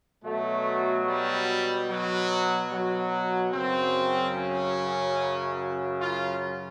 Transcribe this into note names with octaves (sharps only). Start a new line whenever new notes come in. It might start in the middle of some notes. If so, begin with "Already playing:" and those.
B2 F#3 A3
G3
F#3
F#3
F#2 C#3 F#3 C4
C#4
F4